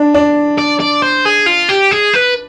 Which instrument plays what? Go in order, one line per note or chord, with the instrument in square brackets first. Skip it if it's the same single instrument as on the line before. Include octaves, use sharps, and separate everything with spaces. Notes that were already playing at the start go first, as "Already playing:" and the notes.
Already playing: [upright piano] D4
D4
[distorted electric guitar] D5
D5
C5
G#4
F4
G4
G#4
B4